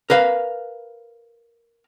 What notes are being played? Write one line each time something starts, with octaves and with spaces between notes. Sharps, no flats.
A#4 B4 F5